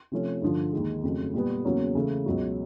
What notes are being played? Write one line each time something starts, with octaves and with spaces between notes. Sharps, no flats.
C3 F3 A3 C#4
G2 D3 F3
D#2 D#3 G#3
F2 C#3 F#3 A3
A#2 G3 B3
E2 C#3 F#3 A#3 C#4
C#3 E3 A3
C#2 B2 F#3